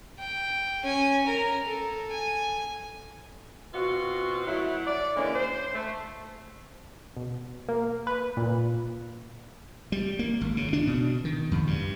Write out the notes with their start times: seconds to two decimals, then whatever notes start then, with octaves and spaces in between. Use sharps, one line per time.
0.19 G5
0.83 C#4 G#5
1.26 A#4
1.64 A4
2.11 G#5
3.74 B2 C4 F4 F#4
4.47 F#3 A3 E4
4.87 D5
5.16 D3 E3 G#3 A#3 C#4
5.35 C5
5.75 A3
7.17 B2
7.69 A#3
8.07 B4
8.37 A#2
9.92 G3
10.19 A#3
10.41 G#1
10.57 C#3
10.73 D4
10.87 B2
11.25 D#3
11.51 F2
11.67 G2